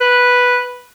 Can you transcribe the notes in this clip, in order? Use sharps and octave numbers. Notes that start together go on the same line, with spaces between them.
B4